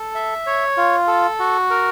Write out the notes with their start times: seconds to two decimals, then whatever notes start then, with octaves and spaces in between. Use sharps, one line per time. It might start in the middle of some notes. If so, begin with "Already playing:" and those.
Already playing: A4
0.15 E5
0.47 C#5
0.77 F4
1.08 A4
1.39 F#4
1.70 A#4